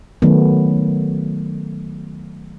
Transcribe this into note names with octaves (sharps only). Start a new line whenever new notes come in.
D#3 F#3 A3 B3